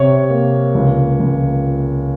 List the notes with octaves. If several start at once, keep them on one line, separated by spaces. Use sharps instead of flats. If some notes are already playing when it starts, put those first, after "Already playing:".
Already playing: C3 C#5
A#3
C#2
C#2